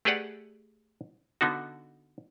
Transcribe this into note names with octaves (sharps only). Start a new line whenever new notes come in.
A3 G4 G#4 B4 D5 F#5
D3 B3 D#4 F#4